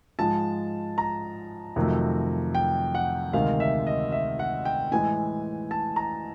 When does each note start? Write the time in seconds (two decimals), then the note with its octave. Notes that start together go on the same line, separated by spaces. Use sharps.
0.19 G#2 F3 G#3 A5
0.98 A#5
1.76 F2 C3 D#3 F#3 A3
2.55 G5
2.95 F#5
3.33 D2 C3 D#3 G#3 F5
3.60 E5
3.87 D#5
4.12 E5
4.39 F#5
4.65 G5
4.92 A2 E3 G#3 G#5
5.71 A5
5.96 A#5